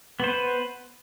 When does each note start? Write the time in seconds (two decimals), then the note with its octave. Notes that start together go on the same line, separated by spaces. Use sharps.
0.20 B3
0.24 C5
0.28 B4